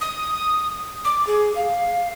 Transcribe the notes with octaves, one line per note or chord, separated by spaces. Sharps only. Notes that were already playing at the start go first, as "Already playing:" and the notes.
D#6
D6
G#4
F5